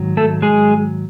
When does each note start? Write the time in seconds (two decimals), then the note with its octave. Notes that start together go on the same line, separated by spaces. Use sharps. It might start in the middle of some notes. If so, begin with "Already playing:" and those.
Already playing: G#2 D#3 F#3
0.17 A3 A4
0.42 G#3 G#4